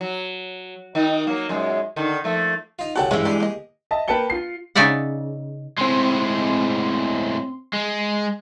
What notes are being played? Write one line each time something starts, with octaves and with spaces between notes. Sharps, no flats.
F#3
D#3 D#4
F#3 A#3
F#2 A#2 G#3
D3 D#3
F3 A3 A#3
D#4 F4
C2 C#4 F#4 A4 F#5 G5
G2 E3 G#3 C#5 F#5
D4 E4 G4 G#4 D5
A#3 D#5
D#5 E5 A5
A#3 B4 G5 A5 C#7 G7
F4 C7
C#3 D#4 C#5 D5 E5 F#5
A2 G#3 C4 C6
G#3